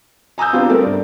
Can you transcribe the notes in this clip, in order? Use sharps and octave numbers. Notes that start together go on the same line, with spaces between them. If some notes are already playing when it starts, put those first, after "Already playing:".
G#5 A#5 D#6 E6 G6
B3 C4 D4 F4 G4
G3 A3 C4 A#4
G2 D5